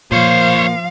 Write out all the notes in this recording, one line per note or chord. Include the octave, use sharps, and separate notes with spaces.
A#2 F3 A#3 C5 C#5 F5